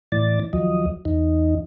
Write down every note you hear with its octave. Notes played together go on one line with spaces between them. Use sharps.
A2 E3 D5 A6
D#2 F3 F#3 D#5
E2 D#4